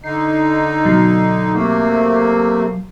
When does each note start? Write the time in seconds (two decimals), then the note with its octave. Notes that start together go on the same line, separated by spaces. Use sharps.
0.04 D3 D#4 C7
0.85 B2 F#3 C7
1.53 C3 A3 A#3